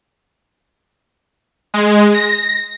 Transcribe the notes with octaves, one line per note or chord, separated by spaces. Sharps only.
G#3
A#6